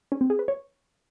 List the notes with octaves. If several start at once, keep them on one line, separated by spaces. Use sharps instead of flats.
C#4
C4
G#4
B4
C#5